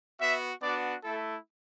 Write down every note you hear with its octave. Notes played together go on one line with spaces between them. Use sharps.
B3 F#4 E5
B3 D4 F#4 D5
A3 E4 A4